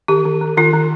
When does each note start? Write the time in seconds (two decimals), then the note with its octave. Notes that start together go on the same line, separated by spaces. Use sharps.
0.08 D#3 G4
0.25 D#3
0.41 D#3
0.57 D#3 F4
0.74 D#3